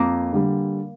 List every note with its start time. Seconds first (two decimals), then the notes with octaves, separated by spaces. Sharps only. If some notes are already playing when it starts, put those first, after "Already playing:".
Already playing: F2 A#3
0.33 D3 G3